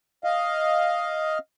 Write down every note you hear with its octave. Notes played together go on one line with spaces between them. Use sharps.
D#5 F5